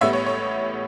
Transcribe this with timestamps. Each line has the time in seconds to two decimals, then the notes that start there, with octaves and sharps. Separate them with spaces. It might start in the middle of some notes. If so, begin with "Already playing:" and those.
0.01 A1 A2 G3 B3 C#5 E5
0.13 C#5
0.26 C#5